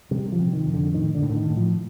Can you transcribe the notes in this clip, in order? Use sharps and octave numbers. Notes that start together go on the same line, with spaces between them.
C3 G3
F3
C3
D#3
F2
D3
A2 D#3
D3
A2
D3
D#3
A2
F3